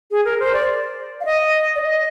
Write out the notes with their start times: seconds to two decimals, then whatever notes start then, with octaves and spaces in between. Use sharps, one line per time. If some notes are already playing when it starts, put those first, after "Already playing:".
0.11 G#4
0.25 A#4
0.40 C5
0.53 D5
1.21 F5
1.25 D#5
1.76 D5
1.82 D#5